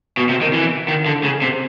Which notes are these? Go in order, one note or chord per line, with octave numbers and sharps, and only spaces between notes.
B2
C3
D#3
E3
D#3
D3
C#3
C3